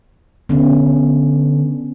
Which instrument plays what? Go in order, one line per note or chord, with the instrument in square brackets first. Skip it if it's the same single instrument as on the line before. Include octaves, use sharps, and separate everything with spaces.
[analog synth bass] D3 [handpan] B3 C#4